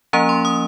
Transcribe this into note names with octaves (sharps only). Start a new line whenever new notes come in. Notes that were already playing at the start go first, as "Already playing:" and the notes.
F3 A#3 C#4 A#5
C6
D#6